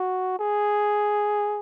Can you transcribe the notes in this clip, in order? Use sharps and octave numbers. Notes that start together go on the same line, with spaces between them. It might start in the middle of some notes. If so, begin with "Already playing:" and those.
Already playing: F#4
G#4